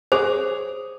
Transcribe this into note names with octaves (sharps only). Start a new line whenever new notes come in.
G#4 C5 C#5 D6